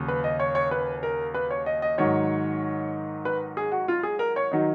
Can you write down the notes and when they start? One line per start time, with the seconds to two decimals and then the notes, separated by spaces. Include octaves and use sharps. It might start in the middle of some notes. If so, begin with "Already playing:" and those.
Already playing: D#2 C#3 F#3
0.08 B4
0.24 D#5
0.40 C#5
0.55 C#5
0.71 B4
1.03 A#4
1.34 B4
1.51 C#5
1.66 D#5
1.82 D#5
1.98 G#2 D#3 F#3 C#5
3.25 B4
3.57 G#4
3.72 F#4
3.88 F4
4.03 G#4
4.19 A#4
4.36 C#5
4.51 D#3 F#3 D#4